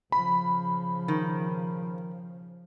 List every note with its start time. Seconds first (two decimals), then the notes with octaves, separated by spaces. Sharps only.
0.12 C#3 F3 B5
1.08 D#3